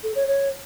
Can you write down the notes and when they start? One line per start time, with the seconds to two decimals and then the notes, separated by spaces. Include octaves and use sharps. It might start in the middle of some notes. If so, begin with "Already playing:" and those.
0.04 A4
0.15 C#5
0.27 C#5